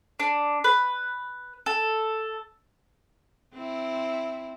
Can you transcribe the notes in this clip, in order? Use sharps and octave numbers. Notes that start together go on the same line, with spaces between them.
D4
B4
A4
C4 E4